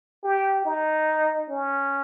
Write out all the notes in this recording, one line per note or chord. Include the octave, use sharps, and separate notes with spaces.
G4
D#4
C#4